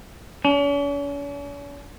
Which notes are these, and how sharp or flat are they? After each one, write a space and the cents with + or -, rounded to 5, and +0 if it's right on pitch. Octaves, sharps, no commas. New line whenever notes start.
C#4 +45